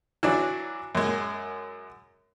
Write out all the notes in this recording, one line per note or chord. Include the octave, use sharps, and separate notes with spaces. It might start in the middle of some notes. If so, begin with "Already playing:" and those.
E3 F#3 D4
F#2 G#3